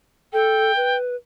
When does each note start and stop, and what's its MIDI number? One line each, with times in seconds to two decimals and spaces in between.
0.33 0.72 69
0.33 0.97 79
0.76 1.15 71